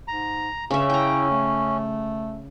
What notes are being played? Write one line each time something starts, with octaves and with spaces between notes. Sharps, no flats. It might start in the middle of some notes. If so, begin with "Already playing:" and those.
G#2 A#5
G2 C#3 C#4 E5
E4 G5 A#5
A3